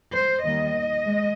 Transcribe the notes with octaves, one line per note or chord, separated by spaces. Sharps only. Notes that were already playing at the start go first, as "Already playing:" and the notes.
C5
D#2 D#3 G3 D#5
G#3